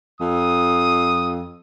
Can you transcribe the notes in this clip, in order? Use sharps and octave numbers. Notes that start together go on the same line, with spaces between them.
F2 D#6